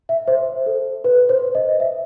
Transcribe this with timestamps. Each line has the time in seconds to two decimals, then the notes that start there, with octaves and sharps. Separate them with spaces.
0.09 E5
0.28 C5
0.66 A4
1.04 B4
1.29 C5
1.55 D#5
1.80 E5